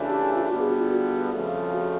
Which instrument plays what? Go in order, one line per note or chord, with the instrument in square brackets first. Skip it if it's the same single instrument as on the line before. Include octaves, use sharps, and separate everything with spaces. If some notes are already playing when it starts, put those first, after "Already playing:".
Already playing: [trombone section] C#3 E3 A3 D4 [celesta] F#4
[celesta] G4
G4
F4
[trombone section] G2 D3 G3 B3 [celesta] F#4
[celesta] G#4
F#4
F4
F#4
[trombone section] F2 C#3 F3 A3
[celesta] F#4